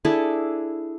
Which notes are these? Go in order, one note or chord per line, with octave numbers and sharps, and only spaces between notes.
D4 E4 G#4 A4